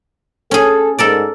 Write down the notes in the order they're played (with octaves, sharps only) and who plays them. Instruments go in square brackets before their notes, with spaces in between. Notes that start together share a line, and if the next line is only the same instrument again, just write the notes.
[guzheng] C#4 G#4 [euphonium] A4
[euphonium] G#2 [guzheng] A4 A#4 D5